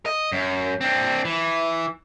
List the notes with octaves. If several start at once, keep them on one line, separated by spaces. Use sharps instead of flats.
D#5
F#2
C4 D4
E3